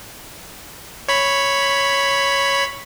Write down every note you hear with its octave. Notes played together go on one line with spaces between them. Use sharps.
C#5 B5